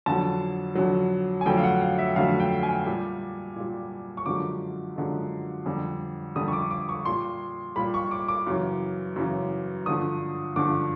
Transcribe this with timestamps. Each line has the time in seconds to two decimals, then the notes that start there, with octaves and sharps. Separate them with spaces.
0.06 F2 D3 F#3 A5
0.75 F2 D3 F#3
1.41 G#5
1.46 F2 D3 F#3 A3 G5
1.57 F5
1.63 F#5
1.81 F5
1.98 E5
2.16 F2 D3 F#3 A3 F5
2.40 G5
2.63 G#5
2.86 A#2 G3
3.56 A#2 G3
4.17 C#6
4.26 F#2 D3 F3 G#3 D6
4.96 F#2 D3 F3 G#3
5.66 F2 D3 G3
6.36 F2 D3 G3 D#6
6.48 C#6
6.53 D6
6.71 D6
6.89 C#6
7.05 A#2 G3 C6
7.76 A#2 G3 B5
7.94 C#6
8.11 D6
8.28 D6
8.47 F#2 C#3 E3
9.16 F#2 C#3 E3
9.86 G2 D3 F3 D#6
10.56 G2 D3 F3 D6